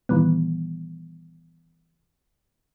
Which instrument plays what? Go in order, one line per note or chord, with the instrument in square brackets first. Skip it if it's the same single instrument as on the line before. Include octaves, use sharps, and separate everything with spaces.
[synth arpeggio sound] A#2 D#3 E3 G3 B3